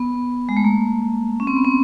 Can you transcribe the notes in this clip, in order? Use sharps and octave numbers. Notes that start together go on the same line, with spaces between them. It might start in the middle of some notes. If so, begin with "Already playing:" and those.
Already playing: B3
G#3
A3
A#3
C#4
C4
B3
C4